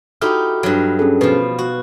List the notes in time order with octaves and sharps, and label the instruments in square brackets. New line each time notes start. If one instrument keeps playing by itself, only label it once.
[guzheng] D#4 E4 G4 [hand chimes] F#4 A4 F6
[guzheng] G2 F#3
[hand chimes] C#4 G#4 A4
[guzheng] B2 F3 [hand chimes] B4
[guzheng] F#4